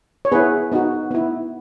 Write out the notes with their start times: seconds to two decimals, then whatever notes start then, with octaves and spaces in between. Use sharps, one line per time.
0.25 C#5
0.32 B3 E4 G#4 B4
0.72 B3 D#4 F#4
1.11 B3 E4